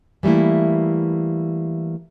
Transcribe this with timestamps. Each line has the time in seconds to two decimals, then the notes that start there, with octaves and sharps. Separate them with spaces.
0.23 E3 G3 A3 A#3 E4